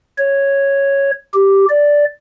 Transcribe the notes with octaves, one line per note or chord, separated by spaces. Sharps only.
C#5
G4
D5